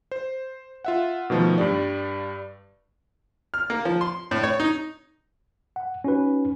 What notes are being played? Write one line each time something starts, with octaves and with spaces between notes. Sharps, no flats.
C5
F4 E5 F#5
B2 D#3 F3 A3 B3
G2 G3 D5
F6
A#3
F3
C6
A2
C#5
D#4
F#5
C#4 D#4 F#4 B4